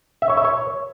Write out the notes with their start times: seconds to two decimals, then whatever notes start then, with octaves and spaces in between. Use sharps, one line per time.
0.22 E5
0.30 C#5
0.37 E5
0.45 C#5